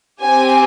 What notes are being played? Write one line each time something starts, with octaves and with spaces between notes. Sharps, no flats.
C4 G4 G#5